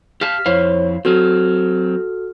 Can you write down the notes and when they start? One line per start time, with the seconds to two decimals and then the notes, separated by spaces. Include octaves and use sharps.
0.21 G4 F5 A5 F6 B6
0.46 F2 E4 C5 C#5 F5
1.05 F#3 C4 F#4 A4 F6